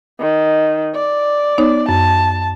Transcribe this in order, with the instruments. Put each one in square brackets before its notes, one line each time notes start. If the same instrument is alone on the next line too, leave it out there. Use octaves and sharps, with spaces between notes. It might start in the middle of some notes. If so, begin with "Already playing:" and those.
[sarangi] D#3
D5
[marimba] B3 D#4 C#5
[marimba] F#2 [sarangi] A5